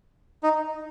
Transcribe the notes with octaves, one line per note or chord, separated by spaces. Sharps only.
D#4